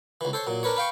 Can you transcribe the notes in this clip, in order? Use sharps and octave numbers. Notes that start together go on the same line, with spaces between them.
C#2 E3
A4 C5 C#5
A#2 F#3
D4 A#4 B4 C#5
B4 F5 G5 C#6